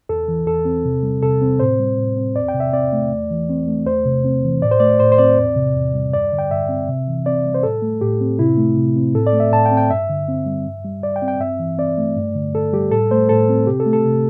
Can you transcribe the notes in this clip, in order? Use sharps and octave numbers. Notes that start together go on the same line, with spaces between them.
E2 A4
E3
E2 A4
C4
C3
G3
C3 A4
C4
A2 C5
G3
A2
C4
E2 D5
G5
C3
E5
C4 D5
A3
E2
E3
C4
A3
E2 C5
C3
C4
E3
A2 D5
C5
A3 D5
A2 C5
C5
C4 D5
E2
C3
E2
G3
G2 D5
D3
G5
G2 E5
C4
C3
E3
C4 D5
G3
C5
A2 A4
A3
A2 G4
C4
C3 E4
A3
C3
C4
A2 A4
D5
A3
E5
A2 A5
G5
C4
G5
G2 E5
D3
C4
G3
G2
G3
G2 D5
G5
C4
G5
G2 E5
E3
C4 D5
A3
G2
D3
G2 A4
G3 G4
A2 A4
A3 C5
A2 A4
C4
C3 G4
A4
A3
A4
C3